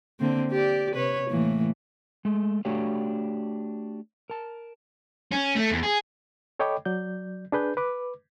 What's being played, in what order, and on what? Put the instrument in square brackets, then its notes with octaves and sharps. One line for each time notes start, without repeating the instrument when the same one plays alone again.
[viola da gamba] D3 A#3 C4
G4 D5
C3 B4 C#5
A2 E3 A#3
[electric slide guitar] G#3 A3
A3 D4 F#4 G4 C#5 F5
A#4 A5
[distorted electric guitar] C#4
A3
E2
G#4
[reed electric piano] A4 C#5 D#5 G5 B5 D6
F#3 D5 G6
D4 G#4 B4 G6
B4 D6